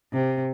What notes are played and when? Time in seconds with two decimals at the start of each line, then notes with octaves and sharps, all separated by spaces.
0.13 C3